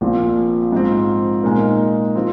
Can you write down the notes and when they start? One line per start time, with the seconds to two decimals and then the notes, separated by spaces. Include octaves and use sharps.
0.01 A#1 A#2 F3 C4
0.72 G#2 F3 C4
1.43 A#2 G#3 D#4 A#4
2.16 F3 C4